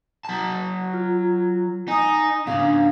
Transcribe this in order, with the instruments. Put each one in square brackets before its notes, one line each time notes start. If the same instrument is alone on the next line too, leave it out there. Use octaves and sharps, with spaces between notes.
[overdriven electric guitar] F#3 A5
[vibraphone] F4
[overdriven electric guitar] D#4 [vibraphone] G#5 D#6
[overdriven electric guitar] G#2 C#3 [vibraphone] D4 F5